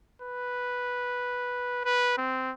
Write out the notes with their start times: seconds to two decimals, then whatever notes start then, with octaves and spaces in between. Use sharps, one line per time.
0.22 B4
1.85 B4
2.18 C4